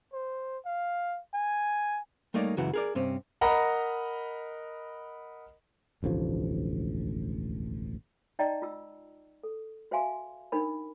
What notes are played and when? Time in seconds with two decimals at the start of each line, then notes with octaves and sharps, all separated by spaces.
0.13 C5
0.66 F5
1.34 G#5
2.34 G3 A3 A#3 D#4 C#5 D5
2.57 C#2 F#2 C#3 E3 F#4 A#5
2.74 G#4 A#4 D5
2.95 G2 C3 C4 C#4
3.41 A#4 D#5 F#5 A#5 B5
6.03 E1 A1 D2 F3
8.39 D#4 D5 D#5 G5 A5 A#5
8.62 F4 E6
9.43 A4
9.91 F#4 C5 E5 F5 G#5 C6
10.52 D4 D#4 A#4 C5 B5